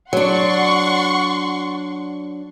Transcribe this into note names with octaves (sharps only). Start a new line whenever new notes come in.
F#3 D4 F#5 C6 C#6